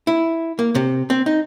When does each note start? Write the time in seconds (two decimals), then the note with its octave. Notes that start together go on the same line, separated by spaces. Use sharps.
0.07 E4
0.59 A#3
0.75 C3
1.10 C4
1.26 D#4